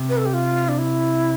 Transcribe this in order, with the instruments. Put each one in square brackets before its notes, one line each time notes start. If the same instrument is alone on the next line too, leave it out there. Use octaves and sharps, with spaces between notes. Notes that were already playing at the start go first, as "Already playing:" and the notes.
Already playing: [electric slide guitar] C3
[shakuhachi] B4
A4
G4
F4
D4
E4